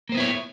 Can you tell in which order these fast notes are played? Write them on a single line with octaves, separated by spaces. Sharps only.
A#3 C5 B3 E4 C#5